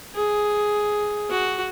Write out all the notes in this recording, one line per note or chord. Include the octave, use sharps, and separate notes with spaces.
G#4
F#4